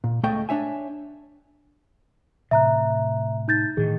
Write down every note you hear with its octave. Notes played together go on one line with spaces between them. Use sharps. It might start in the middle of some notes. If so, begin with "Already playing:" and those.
A#2
C#2 A3 A4 C#5 D#5 G5
D4 C#5 E5 G#5
A2 C3 E3 E5 A#5 F#6
D#4 G6 A6
A2 D#3 E3 G#4